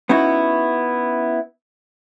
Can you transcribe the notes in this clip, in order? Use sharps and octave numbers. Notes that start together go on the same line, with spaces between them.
B3 C#4 D#4 E4 F#4